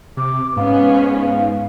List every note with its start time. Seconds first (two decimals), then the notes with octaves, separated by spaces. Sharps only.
0.17 C3 D6
0.56 G#2 B3 C#4 F5